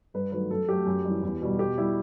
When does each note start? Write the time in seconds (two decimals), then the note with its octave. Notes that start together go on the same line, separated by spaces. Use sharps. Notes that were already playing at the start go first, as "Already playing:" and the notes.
0.14 G2 B4
0.32 D#3 F#3 A3 B4
0.51 F#2 A4
0.69 F#3 A3 G4
0.86 F#2
1.05 E3 G3
1.23 E2
1.42 B2 G3
1.59 B2 G4
1.78 G3 E4